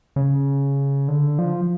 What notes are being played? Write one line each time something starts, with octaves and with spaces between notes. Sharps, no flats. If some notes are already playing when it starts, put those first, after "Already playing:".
C#3
D3
F3